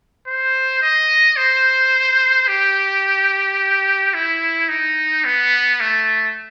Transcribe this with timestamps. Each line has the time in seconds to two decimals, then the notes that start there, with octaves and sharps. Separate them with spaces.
0.27 C5
0.82 D#5
1.37 C5
2.48 G4
4.14 E4
4.69 D#4
5.25 B3
5.80 A3